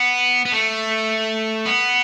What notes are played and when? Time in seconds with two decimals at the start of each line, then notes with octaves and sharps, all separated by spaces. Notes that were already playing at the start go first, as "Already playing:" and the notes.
Already playing: B3
0.45 B3
0.52 A3
1.66 B3